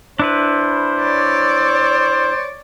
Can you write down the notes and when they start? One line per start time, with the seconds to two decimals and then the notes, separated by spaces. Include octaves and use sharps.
0.19 D4 E4 B4 C5
1.00 C#5 D5